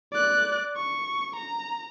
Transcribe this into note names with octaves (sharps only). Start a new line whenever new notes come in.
D5 F#6
C#6
A#5